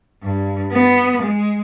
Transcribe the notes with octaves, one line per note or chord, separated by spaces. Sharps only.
G2
B3
G#3